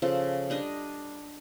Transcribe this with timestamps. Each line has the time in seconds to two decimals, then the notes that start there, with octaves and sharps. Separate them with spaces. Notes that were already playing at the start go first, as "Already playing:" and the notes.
0.02 C#3 F3 A4
0.50 G3 D4 D#5